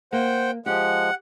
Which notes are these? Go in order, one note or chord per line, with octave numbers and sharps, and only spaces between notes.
A#3 C5 F#5 G5
F3 G#3 G4 F#5